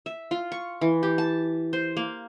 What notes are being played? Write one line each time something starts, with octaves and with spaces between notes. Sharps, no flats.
E5
F4
C#6
E3
G4
A5
C5
A#3